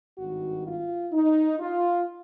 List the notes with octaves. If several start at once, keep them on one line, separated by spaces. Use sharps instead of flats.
G#1 G2 D#3 F#4
F4
D#4
F4